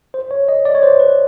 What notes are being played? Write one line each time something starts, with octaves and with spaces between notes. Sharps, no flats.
C5
C#5
D#5
D5
C#5
C5
B4